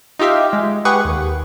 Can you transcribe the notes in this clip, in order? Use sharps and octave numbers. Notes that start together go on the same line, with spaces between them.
D#4 F4 G4 E5 F5
G#3
G4 G#4 B4 F#5 C#6
D#2